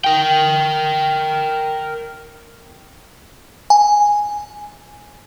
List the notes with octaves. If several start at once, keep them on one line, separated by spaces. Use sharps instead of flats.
A#4 G5
G#5